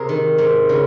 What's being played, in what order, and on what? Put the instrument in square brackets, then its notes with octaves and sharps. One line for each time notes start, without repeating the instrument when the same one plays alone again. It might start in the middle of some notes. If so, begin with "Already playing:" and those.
Already playing: [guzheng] C3 G#4 A#4 C5
D#3
G#2
C#3